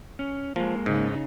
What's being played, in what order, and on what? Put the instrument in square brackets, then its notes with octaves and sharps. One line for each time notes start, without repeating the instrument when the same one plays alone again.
[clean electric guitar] C#4
[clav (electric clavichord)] F3 [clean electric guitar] G#3 A#3
[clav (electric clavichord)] G#2 [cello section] C#3 D#4